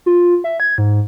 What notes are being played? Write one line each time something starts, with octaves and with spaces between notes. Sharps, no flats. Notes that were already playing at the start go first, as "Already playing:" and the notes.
F4
E5
G#6
G#2